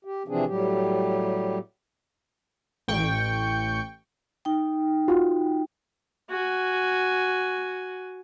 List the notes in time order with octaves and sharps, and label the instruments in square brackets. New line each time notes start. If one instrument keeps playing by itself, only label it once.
[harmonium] G4
C3 E3 F3 C4 D4 G#4
A2 F#3 G3 G4
[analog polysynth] A1 G5 C#6
[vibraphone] D#4 G5
[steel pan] F4 F#4
[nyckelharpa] F#4 G#5